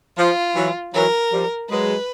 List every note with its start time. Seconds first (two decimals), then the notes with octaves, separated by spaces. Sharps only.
0.18 F3 F4
0.56 E3 F#3
0.94 E3 F#3 A#4
1.32 F3 G3
1.70 F#3 G#3 B4